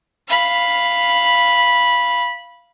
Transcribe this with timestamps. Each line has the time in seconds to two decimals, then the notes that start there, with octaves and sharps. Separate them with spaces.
0.29 F5 B5